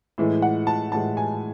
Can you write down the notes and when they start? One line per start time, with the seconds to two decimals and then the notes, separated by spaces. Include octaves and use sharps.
0.18 A2 E3 G#3
0.42 F#5
0.67 A5
0.92 A2 E3 G#3 A5
1.17 G#5